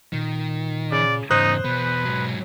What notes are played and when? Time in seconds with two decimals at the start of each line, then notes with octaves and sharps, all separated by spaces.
0.13 A#2 D#3
0.92 C#3 D5
1.31 E2 G#2 C#3 D#4 C5 D#6 F#6
1.65 E2 B2 B3 B4
2.05 G#2 F#3